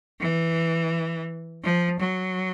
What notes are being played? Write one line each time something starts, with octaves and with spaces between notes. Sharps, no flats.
E3
F3
F#3